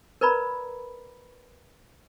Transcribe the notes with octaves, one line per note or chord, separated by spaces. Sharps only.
A#4 B4 D5 A#5 B5